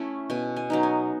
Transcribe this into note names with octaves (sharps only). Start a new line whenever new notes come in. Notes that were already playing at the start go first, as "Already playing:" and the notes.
Already playing: A3 C#4 E4
B2 G#5
G#5
F#3 B3 D#4
G#5